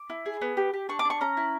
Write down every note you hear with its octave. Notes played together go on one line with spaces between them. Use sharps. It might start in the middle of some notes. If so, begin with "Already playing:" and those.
Already playing: D6
E4
G#4
B3
G4
G4
D4 C#6
D6
D4 C#6
C#4 A#5
E4